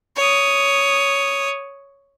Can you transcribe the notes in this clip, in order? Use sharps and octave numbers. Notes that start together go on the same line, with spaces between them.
C#5 D#6